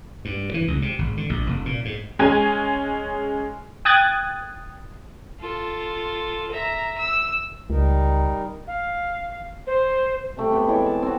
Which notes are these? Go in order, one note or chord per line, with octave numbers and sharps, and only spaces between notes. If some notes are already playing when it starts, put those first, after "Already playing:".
G2
E3
C#2
C3
G#1
D3
A#1
F1
A#2
G#2
G#3 C#4 G#4 G#5 G#6 D#7
G5 D#6 F#6 G#6 A6
F4 A4
E5 A#5
E6
C#2 G3 D#4 A#4
F5
C5
C3 A3 G4
B3 G4 C5 G5
E3 G#3 G4 C#5
A5
C4 F#4